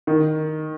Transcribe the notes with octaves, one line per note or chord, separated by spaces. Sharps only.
D#3